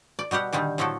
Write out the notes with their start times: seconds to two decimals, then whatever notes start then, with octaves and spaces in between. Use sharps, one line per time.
0.19 D5
0.31 B2 G3 G4 F#5
0.53 A#2 D3 D#3 G3
0.78 A2 F3 F#3 A3 A4